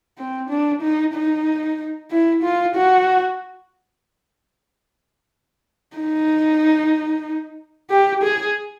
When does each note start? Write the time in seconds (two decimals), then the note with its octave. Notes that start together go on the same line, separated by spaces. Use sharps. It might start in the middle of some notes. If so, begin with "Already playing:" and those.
0.18 C4
0.49 D4
0.82 D#4
1.14 D#4
2.11 E4
2.43 F4
2.75 F#4
5.97 D#4
7.90 G4
8.23 G#4